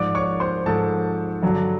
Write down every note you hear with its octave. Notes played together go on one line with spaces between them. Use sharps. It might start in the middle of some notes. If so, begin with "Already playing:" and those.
Already playing: G#2 F3 D5 D6
C#5 C#6
C5 C6
G#2 F3 A4 A5
G2 D3 F#3